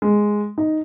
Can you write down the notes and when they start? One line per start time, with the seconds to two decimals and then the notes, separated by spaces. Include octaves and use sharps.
0.02 G#3
0.58 D#4